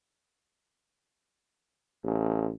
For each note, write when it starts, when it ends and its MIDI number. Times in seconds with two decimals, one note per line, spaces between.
2.04 2.51 33